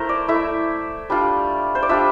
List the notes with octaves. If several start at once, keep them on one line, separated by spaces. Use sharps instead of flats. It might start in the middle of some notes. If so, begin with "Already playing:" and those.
Already playing: A3 E4 A#4 C5
D5
A3 E4 E5
G3 D4 F4
C5
D5
G3 D4 F4 E5